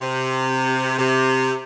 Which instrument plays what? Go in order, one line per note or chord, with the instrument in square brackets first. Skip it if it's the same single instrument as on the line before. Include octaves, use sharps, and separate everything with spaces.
[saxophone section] C3
C3